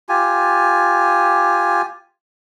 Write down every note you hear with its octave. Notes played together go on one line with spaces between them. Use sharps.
F4 G4 G#5